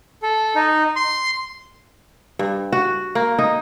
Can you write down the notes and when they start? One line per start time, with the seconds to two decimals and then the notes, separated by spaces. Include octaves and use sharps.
0.23 A4
0.55 D#4
0.96 C6
2.39 G2
2.72 F#4
3.15 A#3
3.39 D#4